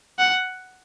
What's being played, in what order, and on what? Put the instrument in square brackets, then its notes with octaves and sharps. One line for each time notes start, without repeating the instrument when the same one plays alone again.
[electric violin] F#5